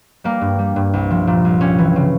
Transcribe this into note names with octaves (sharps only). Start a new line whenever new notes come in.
G3 A#3
G2
G3
G2
C2
F3
A#2
C2
G3 C#4
E3
C#3